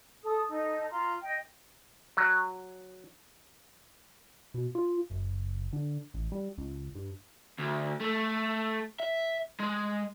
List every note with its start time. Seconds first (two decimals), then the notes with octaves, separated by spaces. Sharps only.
0.23 A4 D#6
0.48 D#4 A4
0.90 F4 A#5 C6
1.22 D#5 G5
2.17 F#3
4.54 B2
4.75 F4
5.10 F#1
5.73 D3
6.14 A1
6.32 G3
6.58 C#2
6.95 G2
7.58 D2
8.00 A3
9.00 E5
9.60 G#3